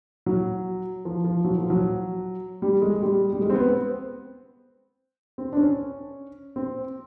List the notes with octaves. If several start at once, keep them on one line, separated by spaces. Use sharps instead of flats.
F#3
F3
F3
F#3
F3
F#3
G3
G#3
G#3
G3
G3
G#3
C4
B3
C4
C4
D4
C#4
C4